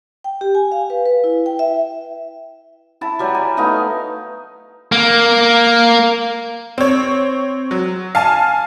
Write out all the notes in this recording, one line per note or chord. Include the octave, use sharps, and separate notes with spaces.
G5
G4
G#5
F5
B4
B4
E4
G5
E5
E4 A5
F#3 G3 D5
G#5
A3 B3 D#4 F5
A#3
C4 C#5
F#3
F5 G#5 A5